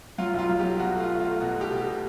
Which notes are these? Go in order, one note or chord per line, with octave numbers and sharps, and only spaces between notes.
F#3 F4
B1 F4
F#3
G4
F#3
B2 F#4
A3
F4
A3
F4
A3
B2 F#4
A3
G4
B2
G4
B2